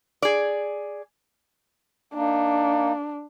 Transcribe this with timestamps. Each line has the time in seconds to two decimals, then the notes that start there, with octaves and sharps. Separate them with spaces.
0.22 G#4 D5
2.14 A#3 D4 D#4